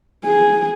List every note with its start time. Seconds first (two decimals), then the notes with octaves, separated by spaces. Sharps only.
0.25 G#4